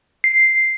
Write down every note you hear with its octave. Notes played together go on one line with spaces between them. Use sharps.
C7